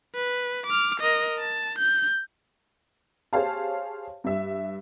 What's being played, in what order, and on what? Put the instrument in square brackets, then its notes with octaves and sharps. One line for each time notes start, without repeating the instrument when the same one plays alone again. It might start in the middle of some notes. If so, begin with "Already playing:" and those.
[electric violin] B4
D6 F6
A#4 D#5
A5
G6
[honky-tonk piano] G4 G#4 C5 C#5 F5 A5
G2 E5